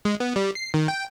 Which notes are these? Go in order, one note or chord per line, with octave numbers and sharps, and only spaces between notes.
G#3
B3
G3
C7
D#3
G5